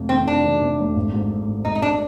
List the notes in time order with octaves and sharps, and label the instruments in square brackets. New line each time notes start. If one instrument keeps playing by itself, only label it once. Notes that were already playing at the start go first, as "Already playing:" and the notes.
Already playing: [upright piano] F1 F2 C3
[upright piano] D#3 [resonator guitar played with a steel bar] C4
[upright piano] C3 [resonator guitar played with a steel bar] D4
[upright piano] D#3
C3
F1
G#1
G#2
G3
G#2
[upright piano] G#1 [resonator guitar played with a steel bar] D#4
[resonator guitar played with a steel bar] D#4
[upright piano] G#2 [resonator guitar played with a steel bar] D4